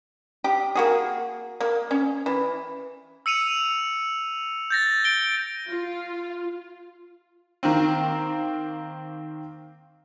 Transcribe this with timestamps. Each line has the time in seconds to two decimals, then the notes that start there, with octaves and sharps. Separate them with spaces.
0.44 G4
0.75 A#3 F#4 G#4
1.60 A#3
1.91 C#4
2.26 E3
3.26 E6 C#7 D#7 F7
4.70 G6 A6 A#6
5.04 D7 G7
5.69 F4
7.63 D#3 A#3 C4